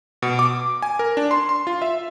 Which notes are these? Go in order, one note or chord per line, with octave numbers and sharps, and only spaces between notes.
B2
D6
G#5
A#4
D4
C6
C6
F4
E5